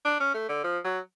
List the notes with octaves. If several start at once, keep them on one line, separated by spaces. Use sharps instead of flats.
D4
C#4
A3
D3
F3
F#3